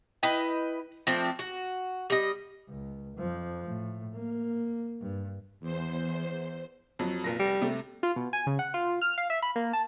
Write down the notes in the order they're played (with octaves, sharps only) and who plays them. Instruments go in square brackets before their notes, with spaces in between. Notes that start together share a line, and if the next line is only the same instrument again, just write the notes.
[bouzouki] E4 B4 D#5 G5
F3 A3 C4 D4
F#4
G3 D#5
[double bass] C#2
F2 F3
A2
A#3
G2
[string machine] E2 C5
[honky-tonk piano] F2 F#3
[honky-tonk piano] F1 A#6 [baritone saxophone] A#2
[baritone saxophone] G3
[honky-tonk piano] C3 A3
[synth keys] F4
B2
G#5
C#3
F#5
F4
F6
F5
E5
B5
A#3
A5